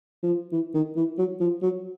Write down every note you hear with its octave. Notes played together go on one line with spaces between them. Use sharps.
F3
E3
D#3
E3
F#3
F3
F#3